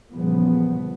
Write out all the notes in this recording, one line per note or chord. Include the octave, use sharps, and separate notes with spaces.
E2 A#2 C#3 F3 G3 B3